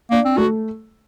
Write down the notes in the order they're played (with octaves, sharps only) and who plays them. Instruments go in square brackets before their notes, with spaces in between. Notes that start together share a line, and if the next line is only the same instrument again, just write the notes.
[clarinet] A#3 [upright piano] D4
[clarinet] C4
[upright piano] A3 [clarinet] F#4